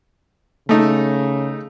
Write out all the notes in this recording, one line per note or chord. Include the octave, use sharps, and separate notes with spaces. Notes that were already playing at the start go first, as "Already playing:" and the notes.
C#3 A3 D#4